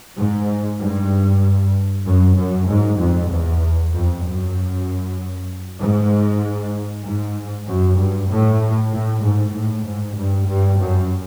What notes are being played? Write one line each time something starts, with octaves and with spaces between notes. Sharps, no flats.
G#2
G2
F#2
F#2
G#2
F2
E2
F2
F#2
G#2
G#2
F#2
G2
A2
A2
G#2
A2
G#2
G2
G2
F#2